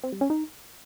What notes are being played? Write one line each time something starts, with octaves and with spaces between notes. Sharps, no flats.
C4
G3
C#4
D#4